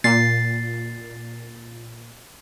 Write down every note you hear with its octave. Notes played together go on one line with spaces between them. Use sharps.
A#2 A6 C7